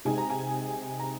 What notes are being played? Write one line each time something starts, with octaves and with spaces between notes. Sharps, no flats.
C3 G#3 D#4 G#5
A#5
G#5
A#5